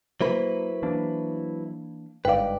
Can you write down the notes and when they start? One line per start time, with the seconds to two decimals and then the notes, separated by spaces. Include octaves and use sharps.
0.21 F#3 A#3 E4 B4 C5
0.83 E3 A#3 D4
2.25 G1 G#2 B4 D5 F5 G5